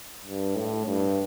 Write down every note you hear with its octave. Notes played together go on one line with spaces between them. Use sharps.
G2
A2
G2